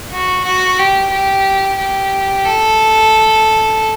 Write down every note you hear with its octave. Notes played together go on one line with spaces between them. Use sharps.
F#4
F#4
G4
G4
G4
A4